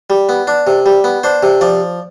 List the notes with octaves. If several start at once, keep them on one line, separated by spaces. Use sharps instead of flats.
G3
B3
D4
C3
G3
B3
D4 C5
C3
F3 D5